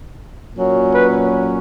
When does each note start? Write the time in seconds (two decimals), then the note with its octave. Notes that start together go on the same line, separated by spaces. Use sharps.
0.55 A#2 F#3 C#4
0.94 B4